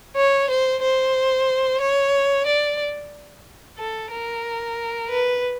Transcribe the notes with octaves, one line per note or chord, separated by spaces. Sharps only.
C#5
C5
C5
C#5
D5
A4
A#4
B4